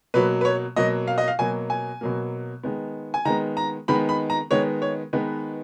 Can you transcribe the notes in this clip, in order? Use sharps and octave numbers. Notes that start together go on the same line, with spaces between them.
B2 F#3 A#3 B4
B4
C#5
B2 F#3 A#3 D#5
F5
D#5
F5
B2 F#3 A#3 G#5
G#5
B2 F#3 A#3
D#3 G#3 B3
G#5
D#3 G#3 B3 A#5
A#5
D#3 G#3 B3 B5
B5
A#5
D#3 G#3 B3 C#5
C#5
D#3 G#3 B3 B4